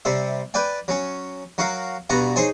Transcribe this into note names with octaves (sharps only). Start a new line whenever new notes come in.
C3 G3 C5 E5
B4 D5 G5 G#5
F#3 C#4
F#3 F#4 A#4 F5
G2 B2 F#4 G#5 A#5
D#4 G#4 C5 C#5 G#5